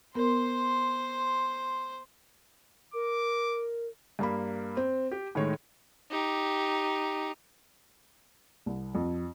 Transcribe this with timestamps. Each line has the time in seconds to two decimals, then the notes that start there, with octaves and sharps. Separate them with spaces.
0.15 B3 A#4 C5 C6
2.94 A#4 D6
4.19 G2 A#3 B5
4.77 C4
5.11 G4
5.35 A2 D#3 G#3 C#5
6.11 D#4 G4
8.66 C2
8.95 F2